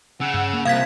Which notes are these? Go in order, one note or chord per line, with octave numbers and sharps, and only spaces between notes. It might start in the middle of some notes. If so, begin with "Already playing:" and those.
C#3 F#5 E6
G2
A#3
C2 C3 F3 F5 G#6 B6